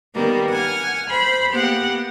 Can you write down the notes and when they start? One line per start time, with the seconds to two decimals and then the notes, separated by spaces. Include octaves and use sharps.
0.16 D#3 G3 A#3 B3
0.51 F#5 G#5 F6
1.10 C5 B5
1.53 A#3 B3 G4 F#5